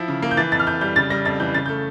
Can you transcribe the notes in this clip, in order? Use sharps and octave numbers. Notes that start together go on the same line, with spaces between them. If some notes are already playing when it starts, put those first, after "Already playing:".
Already playing: F3 E4
C#3
A#3
G6
E3 A6
F2 A6
F6
F2 G6
G3 G6
C#3 A6
G3 A#6
F2 A6
E3 G6
C#3 A6
A3 G6